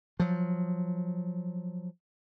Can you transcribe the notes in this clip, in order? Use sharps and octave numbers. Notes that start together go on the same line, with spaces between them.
F3 F#3